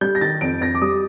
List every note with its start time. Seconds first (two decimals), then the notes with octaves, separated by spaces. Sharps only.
0.01 G3 G6
0.15 A#6
0.21 D#3 A6
0.41 F2 D7
0.61 F2 A#6
0.75 D6
0.82 G3 D#6